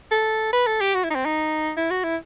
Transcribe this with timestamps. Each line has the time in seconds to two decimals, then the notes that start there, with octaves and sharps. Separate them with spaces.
0.12 A4
0.53 B4
0.67 A4
0.81 G4
0.95 F#4
1.04 E4
1.10 D#4
1.15 C4
1.25 D#4
1.77 E4
1.91 F#4
2.04 E4